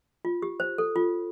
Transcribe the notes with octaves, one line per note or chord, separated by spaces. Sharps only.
F4
G4
C5
A4
F4